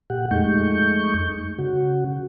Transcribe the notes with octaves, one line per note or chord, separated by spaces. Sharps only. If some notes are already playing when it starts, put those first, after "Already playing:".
A#2 G4 F#5
F2 G#3 A3 D#4 C#6 G6
C#3 F#4